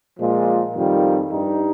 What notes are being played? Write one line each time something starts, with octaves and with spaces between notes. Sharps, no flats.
A#2 F3 G#3 F4
F2 D#3 G3 F4
G2 G3 D#4